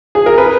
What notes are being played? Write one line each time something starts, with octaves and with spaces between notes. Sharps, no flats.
G#4
A#4
B4